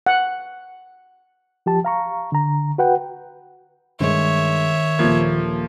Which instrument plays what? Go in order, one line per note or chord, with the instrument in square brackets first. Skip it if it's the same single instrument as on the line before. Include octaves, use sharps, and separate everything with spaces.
[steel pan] F#5
[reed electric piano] F3 G4 A5
F5 A#5 C#6
D3 A#5
F#4 B4 F#5 G5
[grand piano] G2 G#3 [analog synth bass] D#3 [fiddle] C#5 E5
[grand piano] D#1 G#6 [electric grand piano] F3 A#3